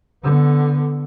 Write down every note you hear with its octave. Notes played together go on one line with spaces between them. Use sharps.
D3 B3